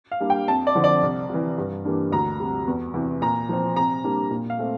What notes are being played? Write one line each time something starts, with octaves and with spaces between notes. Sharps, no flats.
F5
G3 A#3 D4
G5
F2 A5
D5
D3 F3 C4
D5
C2
C3 E3
G2
E3 G3 A#3 D4
D2 A#5
C3 G3
E2
C3 E3
A#2 A#5
F3 C4
C3 A#5
G3 A#3 D4
A#2
F5
A3 C4